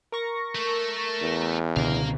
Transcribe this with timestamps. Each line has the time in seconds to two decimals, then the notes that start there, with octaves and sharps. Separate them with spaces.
0.12 A#4 C#6 A#6
0.55 A3 A4
1.22 E2
1.77 C#2 B2 D3 A#4 F5